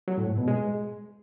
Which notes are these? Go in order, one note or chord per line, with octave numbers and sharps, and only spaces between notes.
F#3
A2
G#2
B2
G#3